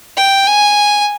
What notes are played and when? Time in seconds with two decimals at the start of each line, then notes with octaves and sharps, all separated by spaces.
0.17 G5
0.47 G#5